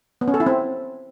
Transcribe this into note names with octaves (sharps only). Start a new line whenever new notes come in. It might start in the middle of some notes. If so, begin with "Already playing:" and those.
B3
C#4
A4
E4
C4